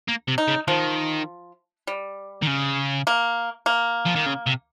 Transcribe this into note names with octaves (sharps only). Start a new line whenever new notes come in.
A#3
C3
D#4
C#3
D#3 F3
G3
D#3
C#3
A#3
A#3
F3
D#3
C#3
C3